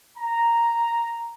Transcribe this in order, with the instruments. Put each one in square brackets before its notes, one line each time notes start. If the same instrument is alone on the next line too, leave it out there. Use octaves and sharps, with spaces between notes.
[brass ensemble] A#5